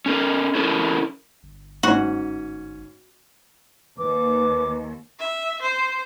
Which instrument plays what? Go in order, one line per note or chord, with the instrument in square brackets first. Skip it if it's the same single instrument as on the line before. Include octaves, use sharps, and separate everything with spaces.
[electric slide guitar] C#4 A4 A#4
C#4 E4 A4 A#4
[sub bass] G1
[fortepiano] G#2 C#4 [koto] F#4
[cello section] D#2 [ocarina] B4 [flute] D6
[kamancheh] E5
C5